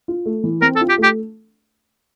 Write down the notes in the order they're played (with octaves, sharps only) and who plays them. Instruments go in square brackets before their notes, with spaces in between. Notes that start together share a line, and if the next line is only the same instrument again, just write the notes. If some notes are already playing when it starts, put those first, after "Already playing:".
[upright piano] F4
A3
E3
[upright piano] C4 [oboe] A#4
[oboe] A4
[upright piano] F4
[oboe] G4
[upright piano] A3
[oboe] G4